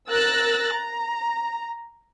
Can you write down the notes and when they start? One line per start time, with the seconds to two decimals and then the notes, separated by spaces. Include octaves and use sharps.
0.10 A#4 E6 F#6 A6 A#6
0.73 A#5